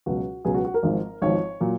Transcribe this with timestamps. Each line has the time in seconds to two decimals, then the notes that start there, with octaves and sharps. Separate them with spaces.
0.06 C#2 B2 F#3 F#4
0.45 C#2 B2 F#3 G#4
0.55 F#4
0.65 F#4
0.74 A#4
0.83 G#1 G#2 F3
1.22 G#1 G#2 F3 C#5
1.61 A#2 F#3